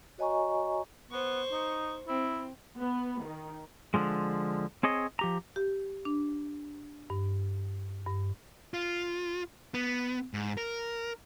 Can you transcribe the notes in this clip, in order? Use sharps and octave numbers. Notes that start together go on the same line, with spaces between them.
F#4 C#5 D#5 G#5 A#5 C#6
B3 C5 C#6
D#4
C4 E4
B3
D#3
D3 F3 G#3
C4 G#4 C#5 D#5
F3 G4 A#5
G4
D4
G2
G2
F4
B3
G#2
A#4